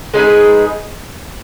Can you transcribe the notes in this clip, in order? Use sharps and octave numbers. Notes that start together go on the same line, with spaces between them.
G#3 D#4 G#4 B4